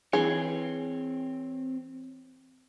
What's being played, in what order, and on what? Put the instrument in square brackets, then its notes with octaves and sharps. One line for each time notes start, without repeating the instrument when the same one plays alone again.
[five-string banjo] E3 G#4 [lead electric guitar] C4 C#5